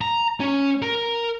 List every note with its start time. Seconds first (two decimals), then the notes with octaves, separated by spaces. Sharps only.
0.01 A#5
0.40 C#4
0.82 A#4